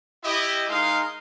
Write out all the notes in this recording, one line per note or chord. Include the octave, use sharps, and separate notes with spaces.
E4 G4 D#5
G#3 D#4 G#4 A#4 F5 C6